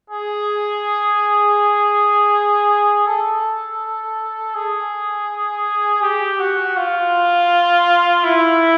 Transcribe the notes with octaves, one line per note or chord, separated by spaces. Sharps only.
G#4
A4
G#4
G4
F#4
F4
E4